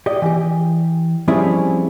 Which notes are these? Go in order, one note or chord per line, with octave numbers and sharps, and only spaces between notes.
G4 D5 D#5
E3 G4
F3 G3 C4 C#4 E4 G#4